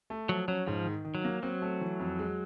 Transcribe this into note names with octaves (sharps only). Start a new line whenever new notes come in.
A3
F3 F#3
F#3 C#4
G#2 F3
D#3
D#3
F#3
A#3
F#3 C4
A3
E3
F2
G#3